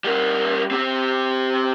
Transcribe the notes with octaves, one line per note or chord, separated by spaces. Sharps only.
G3 A#4
C4 G4